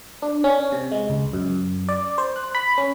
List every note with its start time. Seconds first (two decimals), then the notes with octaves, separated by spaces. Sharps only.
0.22 D4
0.44 C#4
0.72 C3
0.92 G#3
1.10 C#2
1.33 F#2
1.89 D5
2.18 C5
2.36 F#6
2.55 B5
2.78 C#4